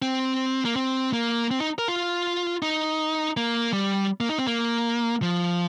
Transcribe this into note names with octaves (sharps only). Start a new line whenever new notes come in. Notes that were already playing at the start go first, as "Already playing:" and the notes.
C4
A#3
C4
A#3
C4
D#4
A#4
F4
D#4
A#3
G3
A#3
D#4
C4
A#3
F3